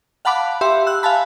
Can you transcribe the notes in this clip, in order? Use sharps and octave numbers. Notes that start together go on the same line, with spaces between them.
F5 F#5 A5 B5 D6 F#6
G4 E5 C6
E6 F#6
F5 G#5 A5 B5